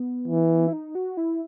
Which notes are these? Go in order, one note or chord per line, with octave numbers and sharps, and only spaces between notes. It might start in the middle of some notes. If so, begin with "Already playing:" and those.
Already playing: B3
E3
E4
D#4
F#4
E4